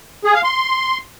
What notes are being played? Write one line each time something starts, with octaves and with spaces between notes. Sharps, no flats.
G#4
F5
C6